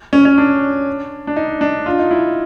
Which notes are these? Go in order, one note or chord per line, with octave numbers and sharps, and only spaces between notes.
C#4
C#4
D4
D4
D#4
D4
F4
D#4
E4